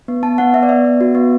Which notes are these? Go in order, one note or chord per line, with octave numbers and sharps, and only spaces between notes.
B3
B3 A5
B3 F#5
B3 E5
D5
B3 E5
B3
F#4
B3